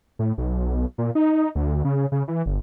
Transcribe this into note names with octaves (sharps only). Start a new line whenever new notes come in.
A2
B1
A#2
D#4
D2
C#3
C#3
E3
G1